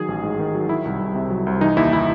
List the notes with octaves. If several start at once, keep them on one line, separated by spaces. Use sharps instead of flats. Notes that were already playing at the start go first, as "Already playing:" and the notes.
Already playing: D#3 F#3 G#4
A1
G#2
D#3
F#3
F#3 E4
C2
C2
C3
F#3
C2
E3 D#4
D#2 E4
E4